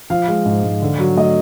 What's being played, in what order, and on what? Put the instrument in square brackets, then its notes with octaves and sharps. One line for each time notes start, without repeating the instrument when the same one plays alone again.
[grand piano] F3 F5
G#3
G#2
G#2
D3
F#3
A3 D#5